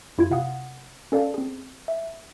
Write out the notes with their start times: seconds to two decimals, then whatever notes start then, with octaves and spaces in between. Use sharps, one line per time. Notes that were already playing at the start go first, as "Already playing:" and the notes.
0.18 F#2 E4 F4 G#6
0.31 C3 F5 F#5 D#6
1.12 C#4 A4 D5 F5 A5
1.34 C4 G#4
1.88 E5